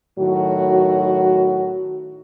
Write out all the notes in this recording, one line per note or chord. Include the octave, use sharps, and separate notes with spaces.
A2 D#3 F#3 F#4